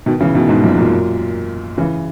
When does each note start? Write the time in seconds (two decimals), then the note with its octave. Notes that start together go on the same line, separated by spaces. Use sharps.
0.06 B2 D#3
0.20 C#3 E3
0.34 B2 D#3
0.49 G#2 B2
0.63 F#2 A#2
0.78 F#2 A#2
1.78 C#3 E3